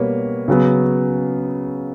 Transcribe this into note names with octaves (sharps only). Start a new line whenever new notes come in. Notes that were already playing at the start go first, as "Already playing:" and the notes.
Already playing: B2 G3 A#3 B4 C#5
C#3 F#3 B3